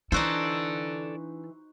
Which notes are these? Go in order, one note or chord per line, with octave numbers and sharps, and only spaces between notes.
E3 D4 D#4 F#4 A4 C5 D5